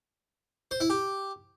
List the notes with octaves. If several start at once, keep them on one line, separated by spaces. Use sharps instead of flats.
C5
E4
G4